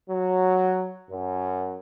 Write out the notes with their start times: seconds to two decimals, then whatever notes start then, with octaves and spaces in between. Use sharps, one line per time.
0.10 F#3
1.11 F#2